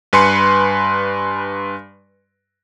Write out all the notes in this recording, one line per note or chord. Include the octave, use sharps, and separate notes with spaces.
G2 B4 G#5 C6 C#7